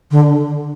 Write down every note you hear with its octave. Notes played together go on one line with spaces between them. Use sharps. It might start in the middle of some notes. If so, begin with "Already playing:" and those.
D3